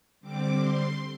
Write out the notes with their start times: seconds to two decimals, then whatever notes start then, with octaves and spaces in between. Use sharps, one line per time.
0.20 D3 G3 C4 D6
0.56 C6